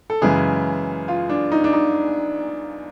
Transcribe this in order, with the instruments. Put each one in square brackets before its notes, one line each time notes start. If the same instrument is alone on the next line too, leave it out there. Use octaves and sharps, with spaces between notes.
[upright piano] A4
F#2 C#3 E3 G#3 G#4
F4
D4
D#4
D4
D#4